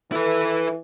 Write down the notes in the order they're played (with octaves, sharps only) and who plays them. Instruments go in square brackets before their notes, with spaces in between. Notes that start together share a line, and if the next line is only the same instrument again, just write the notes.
[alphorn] E3 [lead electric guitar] E4 B4 [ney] A4